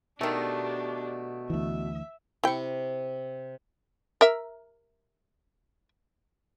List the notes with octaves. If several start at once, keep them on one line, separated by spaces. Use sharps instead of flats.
B2 D#3 A3 D4 G4
D2 E3 E5
C3 E4 G5 C#6
A#4 E5